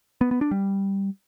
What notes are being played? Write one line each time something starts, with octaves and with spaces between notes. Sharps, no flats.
B3
B3
D4
G3